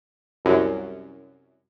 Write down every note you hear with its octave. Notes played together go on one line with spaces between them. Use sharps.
C2 F#2